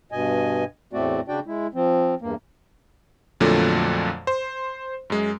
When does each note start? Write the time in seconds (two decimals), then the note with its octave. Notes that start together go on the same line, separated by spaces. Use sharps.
0.12 G2 B2 D#5 G#5
0.93 E2 A2 A3 C4 F#4 D5
1.28 C#3 D4 F#4 D5 G5
1.47 G#3 E4
1.74 F3 C4
2.22 E2 G2 A#3
3.40 F2 A#2 D3 F#3 A3
4.27 C5
5.10 F#2 G#3